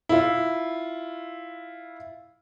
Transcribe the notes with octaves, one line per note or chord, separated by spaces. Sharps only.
E4 F4